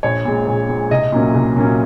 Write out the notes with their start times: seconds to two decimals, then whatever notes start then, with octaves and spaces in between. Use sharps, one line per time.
0.03 A#1 C#5
0.25 A#2 G#3
0.46 A#1
0.69 A#2 G#3
0.91 C2 D#5
1.12 A#2 F#3 A#3 C#4
1.34 C2
1.56 A#2 F#3 A#3 C#4